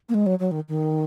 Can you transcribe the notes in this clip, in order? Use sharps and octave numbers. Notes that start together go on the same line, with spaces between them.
A#3
G#3
F#3
F#3
D#3
D#3